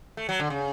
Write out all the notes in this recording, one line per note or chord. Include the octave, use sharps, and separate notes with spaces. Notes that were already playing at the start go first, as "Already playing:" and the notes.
A3
F#3
D3
C#3